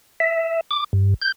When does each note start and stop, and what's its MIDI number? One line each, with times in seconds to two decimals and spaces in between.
0.20 0.61 76
0.71 0.84 86
0.93 1.14 43
1.22 1.32 91